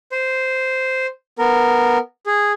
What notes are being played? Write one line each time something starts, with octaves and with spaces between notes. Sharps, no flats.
C5
B3 A#4
G#4